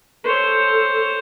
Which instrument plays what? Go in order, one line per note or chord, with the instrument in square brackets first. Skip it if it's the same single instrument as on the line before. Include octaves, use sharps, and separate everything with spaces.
[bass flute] A4 [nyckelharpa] C5 C#5